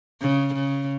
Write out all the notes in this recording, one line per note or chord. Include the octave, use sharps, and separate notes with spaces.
C#3
C#3